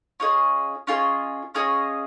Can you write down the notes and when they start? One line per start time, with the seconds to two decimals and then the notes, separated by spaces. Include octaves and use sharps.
0.20 C#4 F4 G#4 D#5
0.87 C#4 F4 G#4 D#5
1.55 C#4 F4 G#4 D#5